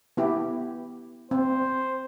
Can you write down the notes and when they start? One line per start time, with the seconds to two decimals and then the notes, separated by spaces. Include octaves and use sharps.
0.17 B3 E4 G4
1.31 C4 C5